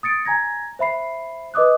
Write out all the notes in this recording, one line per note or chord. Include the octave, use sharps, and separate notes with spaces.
D#6 A6 C#7 D7
G#5 A#5 G#6 A#6
C5 E5 B5 C7
B4 D#5 D6 D#6 F#6